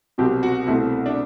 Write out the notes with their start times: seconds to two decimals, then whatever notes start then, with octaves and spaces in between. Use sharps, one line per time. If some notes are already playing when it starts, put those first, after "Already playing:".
0.18 C2 B2 F#3 C4 G4
0.43 F#4
0.67 C2 B2 A3 C4 E4
1.06 D4